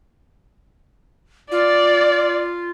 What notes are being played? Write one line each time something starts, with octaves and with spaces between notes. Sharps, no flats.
F4 D5